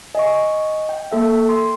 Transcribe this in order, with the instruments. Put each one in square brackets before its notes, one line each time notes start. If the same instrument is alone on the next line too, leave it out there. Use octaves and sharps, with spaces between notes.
[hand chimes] D#5 [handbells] G#5 C#6
[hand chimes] G5
[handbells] A#3 A4 E5
C6